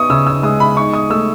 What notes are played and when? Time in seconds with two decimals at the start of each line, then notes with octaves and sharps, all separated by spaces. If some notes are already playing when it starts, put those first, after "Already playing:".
Already playing: B3 D#4 C#6 D#6
0.10 C#3 E6
0.27 E6
0.43 G#3 D#6
0.60 B5
0.77 D#4 C#6
0.93 D#6
1.10 A3 E6